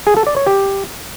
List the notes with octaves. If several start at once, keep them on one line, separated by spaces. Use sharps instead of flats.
G#4
A4
D5
C#5
G4